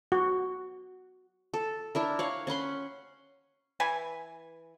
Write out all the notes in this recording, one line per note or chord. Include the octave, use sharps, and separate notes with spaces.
F#4
A4
D4 E4 A#4
C#5 F5 F#5
C#4 F#5 B5 C6
E3 B4 G#5